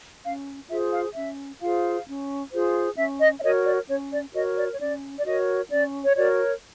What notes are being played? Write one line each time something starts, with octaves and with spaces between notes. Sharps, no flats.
C#4 F5
F4 G#4 C5 E5
F5
C#4 E5
F4 G#4 C5 F5
C#4
F4 G#4 C5
C#4 E5
D#5
E5
F#4 A#4 C#5 D#5
D5
C#4 C#5
D5
F#4 A#4 C#5 D#5
D5
C#5
C#4 D5
D5
F#4 A#4 C#5 D#5
C#4 D5
C#5
F#4 A#4 C#5 D5